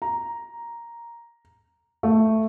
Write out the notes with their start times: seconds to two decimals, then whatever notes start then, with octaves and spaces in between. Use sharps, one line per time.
0.02 A#5
2.03 A3